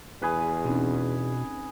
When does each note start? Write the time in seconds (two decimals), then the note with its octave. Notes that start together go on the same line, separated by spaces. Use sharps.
0.22 E2 G#4 B4
0.65 B2 C4 C#4 D#4